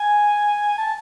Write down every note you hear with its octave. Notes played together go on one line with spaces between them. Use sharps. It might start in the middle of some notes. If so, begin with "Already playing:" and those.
Already playing: G#5
A5